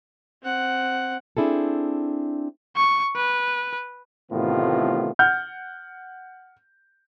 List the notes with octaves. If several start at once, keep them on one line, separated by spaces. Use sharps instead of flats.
C4 F#5
C4 D4 E4 G#4 A4
C#6
B4
A1 A2 C3 D#3 B3 F4
F#5 F6 G6